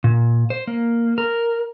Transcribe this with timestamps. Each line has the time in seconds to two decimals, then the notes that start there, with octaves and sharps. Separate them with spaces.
0.04 A#2
0.50 C5
0.67 A#3
1.18 A#4